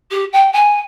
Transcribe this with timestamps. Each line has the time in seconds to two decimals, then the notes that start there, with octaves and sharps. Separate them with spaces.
0.11 G4
0.32 G5
0.52 G#5